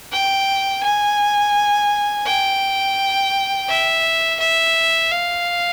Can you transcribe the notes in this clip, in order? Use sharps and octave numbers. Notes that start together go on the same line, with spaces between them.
G5
G#5
G5
E5
E5
F5